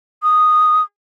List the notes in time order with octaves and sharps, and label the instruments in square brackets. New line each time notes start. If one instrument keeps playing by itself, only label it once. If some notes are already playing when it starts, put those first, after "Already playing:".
[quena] D#6